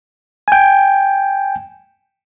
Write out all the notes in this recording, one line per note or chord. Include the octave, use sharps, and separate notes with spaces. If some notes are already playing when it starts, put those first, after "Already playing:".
G5 G#5